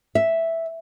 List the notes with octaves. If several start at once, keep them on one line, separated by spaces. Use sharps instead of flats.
E5